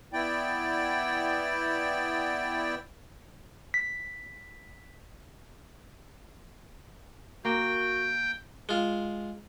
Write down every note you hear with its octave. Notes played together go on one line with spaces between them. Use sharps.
B3 E4 D5 G5
B6
A#3 F#4 G5
G#3 F4